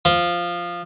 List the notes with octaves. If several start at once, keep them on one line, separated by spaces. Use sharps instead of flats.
F3